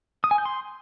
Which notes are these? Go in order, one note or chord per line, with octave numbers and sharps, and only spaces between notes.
D#6
G#5
G6
C6